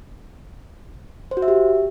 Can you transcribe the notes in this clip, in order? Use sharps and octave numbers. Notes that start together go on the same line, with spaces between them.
C5
F#4
E5
G4